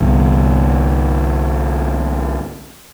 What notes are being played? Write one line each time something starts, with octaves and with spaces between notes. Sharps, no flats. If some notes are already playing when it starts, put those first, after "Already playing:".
G1 C2